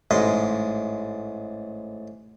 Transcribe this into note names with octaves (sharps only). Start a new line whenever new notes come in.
A1 G#2 D#5